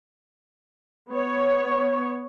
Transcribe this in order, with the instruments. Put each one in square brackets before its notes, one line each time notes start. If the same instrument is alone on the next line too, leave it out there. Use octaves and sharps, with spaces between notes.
[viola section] B3 C#5